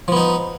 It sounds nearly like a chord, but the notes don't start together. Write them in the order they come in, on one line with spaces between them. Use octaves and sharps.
F3 B3 D#4